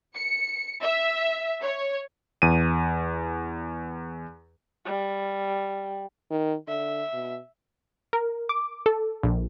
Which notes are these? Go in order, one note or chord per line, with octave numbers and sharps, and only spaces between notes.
C#7
E5
C#5
E2 D#7
G3
D#3
D3 E5
B2
A#4
D6
A4
A#1